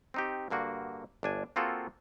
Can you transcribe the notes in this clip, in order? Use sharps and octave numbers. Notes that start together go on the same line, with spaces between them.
C4 D#4 G4
G2 D3 A#3 F#4
G1 D4 G#5
A#3 C4 F4 F#4 G#4 A4